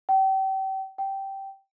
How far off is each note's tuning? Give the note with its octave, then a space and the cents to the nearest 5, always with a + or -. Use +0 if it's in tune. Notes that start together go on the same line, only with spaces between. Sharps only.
G5 -35
G5 -10